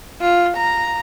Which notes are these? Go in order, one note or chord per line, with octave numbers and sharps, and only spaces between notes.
F4
A#5